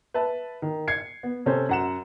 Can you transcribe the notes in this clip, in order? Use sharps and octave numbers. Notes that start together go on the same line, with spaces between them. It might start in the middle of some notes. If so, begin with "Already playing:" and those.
B4 E5 A5
D#3
G#6 C7 C#7
B3
C3 C#4 A4 C5
F#2 F#5 E7